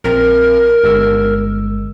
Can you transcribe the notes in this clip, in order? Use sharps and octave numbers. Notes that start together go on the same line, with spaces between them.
A#1 C4 A#4
G1 G#3 E6